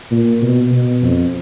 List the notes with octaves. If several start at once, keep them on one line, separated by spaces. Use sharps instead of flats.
A#2
B2
B2
F2